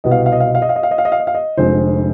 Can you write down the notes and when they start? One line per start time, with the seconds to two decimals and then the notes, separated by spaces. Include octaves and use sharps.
0.04 C2 B2 B3 D#5
0.11 F5
0.19 D#5
0.26 F5
0.32 D#5
0.40 F5
0.47 D#5
0.55 F5
0.62 D#5
0.69 F5
0.76 D#5
0.83 F5
0.91 D#5
0.98 F5
1.05 D#5
1.12 F5
1.20 D#5
1.27 F5
1.34 D#5
1.57 F1 F2 D3 G#3 C4 C5